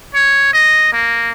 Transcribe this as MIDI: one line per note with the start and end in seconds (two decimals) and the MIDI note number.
0.14 0.50 73
0.53 0.93 75
0.93 1.32 58